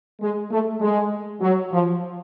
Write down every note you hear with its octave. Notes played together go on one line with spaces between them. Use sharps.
G#3
A3
G#3
F#3
F3